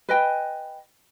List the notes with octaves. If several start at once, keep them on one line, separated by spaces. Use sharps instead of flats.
B4 D#5 G5 G#5